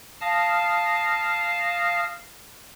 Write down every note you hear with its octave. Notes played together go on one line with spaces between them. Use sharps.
F5 A5 D#6 F6 A#6